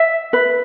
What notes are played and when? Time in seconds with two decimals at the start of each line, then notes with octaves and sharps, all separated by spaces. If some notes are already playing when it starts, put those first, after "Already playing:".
Already playing: E5
0.33 B4